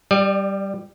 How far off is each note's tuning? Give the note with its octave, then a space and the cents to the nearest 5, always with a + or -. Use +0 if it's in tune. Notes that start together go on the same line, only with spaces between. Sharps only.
G3 +0 D5 +35